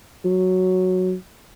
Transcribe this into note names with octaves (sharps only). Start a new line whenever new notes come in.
F#3